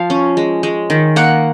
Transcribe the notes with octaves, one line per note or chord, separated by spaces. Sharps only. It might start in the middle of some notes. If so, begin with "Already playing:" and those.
Already playing: F3 F5
C#4
G#3
G#3
D#3
A#3 F#5